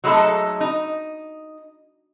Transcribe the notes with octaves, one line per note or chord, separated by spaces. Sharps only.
F#3 G#3 A3 D#4 A4
D#4